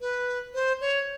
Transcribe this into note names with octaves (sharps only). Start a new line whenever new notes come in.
B4
C5
C#5